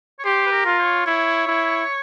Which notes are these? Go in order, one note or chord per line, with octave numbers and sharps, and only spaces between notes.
C#5
G4 C5
B4
A#4
F4
C#5
E4 C#5
E4